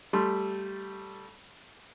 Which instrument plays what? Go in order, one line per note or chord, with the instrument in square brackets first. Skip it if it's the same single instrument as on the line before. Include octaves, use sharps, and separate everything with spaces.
[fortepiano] G3 A3 C6